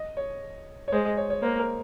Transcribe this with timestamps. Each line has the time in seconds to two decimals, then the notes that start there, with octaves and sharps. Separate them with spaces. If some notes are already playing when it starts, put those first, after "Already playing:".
Already playing: D#5
0.17 C#5
0.88 C#5
0.92 G#3 C5
1.05 D#5
1.17 C#5
1.30 C#5
1.42 A#3 C5
1.59 A#4